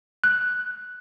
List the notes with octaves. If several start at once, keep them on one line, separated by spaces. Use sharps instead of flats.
F#6